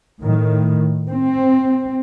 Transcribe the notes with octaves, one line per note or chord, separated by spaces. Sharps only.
A2 D#3
C4